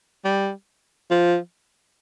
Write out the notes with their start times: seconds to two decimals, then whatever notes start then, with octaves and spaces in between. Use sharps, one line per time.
0.25 G3
1.11 F3